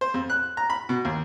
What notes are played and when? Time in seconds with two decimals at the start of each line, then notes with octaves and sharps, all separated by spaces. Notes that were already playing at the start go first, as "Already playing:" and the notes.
0.01 C5
0.14 F2
0.30 F#6
0.57 A#5
0.70 B5
0.89 B2
1.05 D#2